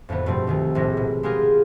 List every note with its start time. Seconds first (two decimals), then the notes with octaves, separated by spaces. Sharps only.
0.09 F2 A2 D3 B3
0.26 G2 B2 F3 A3 C4
0.47 C2 D#3 A3
0.75 A#1 A2 G#3 A#6
0.97 B2
1.23 G#3 B3 F4 G4 G#4 A#4